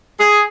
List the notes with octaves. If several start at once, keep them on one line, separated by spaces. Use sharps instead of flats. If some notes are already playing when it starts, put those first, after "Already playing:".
G#4